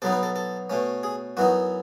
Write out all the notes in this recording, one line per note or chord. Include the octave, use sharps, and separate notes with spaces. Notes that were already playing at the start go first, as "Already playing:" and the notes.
B2 F#3 B3 D#4 A4
B4
A4
A4
B2 A3 C#4
G#4
F#2 E3 B3 D#4 F#4